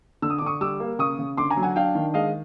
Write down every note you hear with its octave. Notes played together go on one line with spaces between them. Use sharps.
D3 E6
D#6
D6
D3 C#6 D#6
G3 D6 E6
A#3
C#3 C#6 D#6
C#3
D3 C6 D6
G#5 A#5
F#3
F#5 G#5
D4 F5 G5
D#3
G#3 D#5 F5